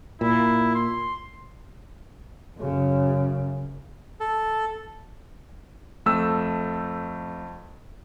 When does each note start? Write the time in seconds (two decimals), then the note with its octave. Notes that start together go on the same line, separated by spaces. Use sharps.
0.21 A#2 E4
0.75 C6
2.59 F#2 C#3
4.20 A4
6.06 F2 A3 E6